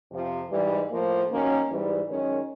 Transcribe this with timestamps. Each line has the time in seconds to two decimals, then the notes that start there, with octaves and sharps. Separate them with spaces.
0.10 F2 C3 F3
0.50 G#2 E3 G3
0.89 A2 F3 A#3
1.29 D#3 F#3 A#3 C#4
1.69 G#2 E3 G3
2.08 F#2 D#3 G#3 C#4